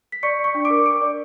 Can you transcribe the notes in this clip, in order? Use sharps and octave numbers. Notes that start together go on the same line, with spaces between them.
B6
D5 C#6 C#7
D5
C#6 C#7
D4
D6 D7
A#4
A#4 D6 D7
D5